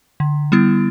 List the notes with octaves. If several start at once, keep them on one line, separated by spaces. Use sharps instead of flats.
D3
G3 B3 E4